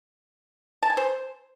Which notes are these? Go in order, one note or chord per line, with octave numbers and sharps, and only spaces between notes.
A5
G#5
C5